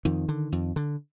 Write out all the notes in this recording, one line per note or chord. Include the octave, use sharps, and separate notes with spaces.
F2 D#3
D3
F2
D3